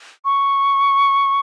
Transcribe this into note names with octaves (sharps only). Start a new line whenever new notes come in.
C#6